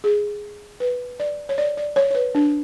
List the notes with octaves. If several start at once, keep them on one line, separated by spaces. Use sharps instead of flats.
G#4
B4
D5
C#5
D5
D5
C#5
C#5
B4
D4